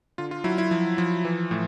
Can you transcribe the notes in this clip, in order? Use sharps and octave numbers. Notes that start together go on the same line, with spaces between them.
D3 F4
F4
F#3 E4
E4
F3
F3
E3
A2